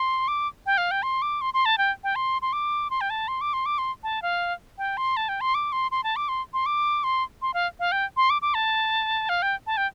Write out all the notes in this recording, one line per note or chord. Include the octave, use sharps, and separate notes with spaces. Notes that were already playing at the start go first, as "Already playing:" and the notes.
Already playing: C6
D6
G5
F5
G5
C6
D6
C6
C6
A5
G5
G5
C6
C6
D6
C6
G5
A5
C6
D6
C6
D6
C6
A5
F5
G5
C6
A5
G5
C6
D6
C6
C6
A5
D6
C6
C6
D6
C6
C6
F5
F5
G5
C6
D6
D6
A5
F5
G5
A5
G5